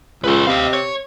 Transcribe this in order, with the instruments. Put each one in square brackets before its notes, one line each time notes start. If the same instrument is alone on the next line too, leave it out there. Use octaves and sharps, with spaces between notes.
[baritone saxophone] C#2 [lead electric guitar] B4 C#5
[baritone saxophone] C3 [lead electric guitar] D#5 F5
[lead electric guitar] C#5